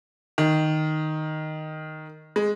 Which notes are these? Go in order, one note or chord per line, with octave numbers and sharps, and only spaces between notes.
D#3
G#3